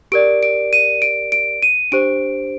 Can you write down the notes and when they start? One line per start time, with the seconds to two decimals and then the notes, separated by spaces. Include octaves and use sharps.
0.12 G4 A#4 D5 D7
0.43 D7
0.73 D#7
1.02 D7
1.32 D7
1.62 D#7
1.92 D4 G4 C5 D7